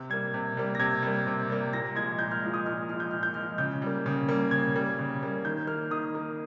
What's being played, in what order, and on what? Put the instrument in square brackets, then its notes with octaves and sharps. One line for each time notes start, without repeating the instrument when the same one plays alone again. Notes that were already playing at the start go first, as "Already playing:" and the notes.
Already playing: [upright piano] C3
G3 A#3 G#6
C3
G3 A#3
A#6
C3 G#6
G3
A#3
C3
G3 A#3
A#2 A#6
F3 G#3 G#6
A#2 G6
F6
F3 G#3
D#6
A#2 F6
F3 G#3 F6
G6
A#2 F6
G6
F3 G#3 F6
C#3 G6
G3 A#3
C#3
G3 A#3
C#3 G#6
G3 A#3
C#3
G3 A#3
D#3 G6
A#3 F6
D#3 D#6
A#3